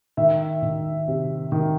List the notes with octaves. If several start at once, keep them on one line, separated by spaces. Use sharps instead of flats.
D#3 E5
D#3
C3
D#3